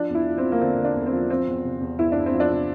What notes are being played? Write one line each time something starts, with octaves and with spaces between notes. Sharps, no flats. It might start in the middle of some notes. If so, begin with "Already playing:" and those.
Already playing: F3 D4
E2 E4
F3
C4
F3
A#3
D3 C4
D3
D4
E2
C4
F3
F3 C4
E2
C3
E2
E2 E4
E2 D4
C4
F3
D4
C3